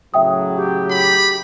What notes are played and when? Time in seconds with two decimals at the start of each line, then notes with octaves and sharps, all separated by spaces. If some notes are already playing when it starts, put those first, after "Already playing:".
0.14 A2 C#3 F#3 E5 G5 D#6
0.56 G4
0.91 B5